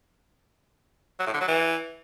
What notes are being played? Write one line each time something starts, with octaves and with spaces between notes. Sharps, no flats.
F#3
A2
D3
F#3
E3